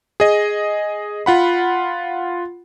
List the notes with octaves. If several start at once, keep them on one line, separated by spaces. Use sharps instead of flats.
G#4 D#5
F4 F#5 B5